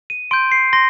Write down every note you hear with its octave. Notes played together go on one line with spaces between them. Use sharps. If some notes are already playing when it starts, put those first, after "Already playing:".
D#7
C6 G6 D7
C7
C6 A#6